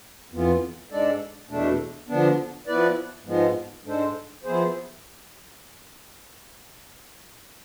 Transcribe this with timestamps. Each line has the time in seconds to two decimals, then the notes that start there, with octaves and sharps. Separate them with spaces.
0.31 F2 E3 B3 F4
0.90 G#2 G#3 D4 A4 D5
1.49 E2 B2 A3 D4
2.08 D3 F3 B3 D4
2.67 F3 B3 E4 B4 D5
3.25 G#2 F3 G#3 B3
3.84 G#2 G#3 D4 A4 C5
4.43 F3 B3 E4 G#4 C5